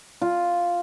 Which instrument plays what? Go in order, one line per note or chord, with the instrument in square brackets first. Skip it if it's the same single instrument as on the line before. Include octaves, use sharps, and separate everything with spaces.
[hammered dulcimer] F4